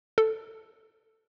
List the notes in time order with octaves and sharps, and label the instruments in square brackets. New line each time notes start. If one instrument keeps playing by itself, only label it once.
[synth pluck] A4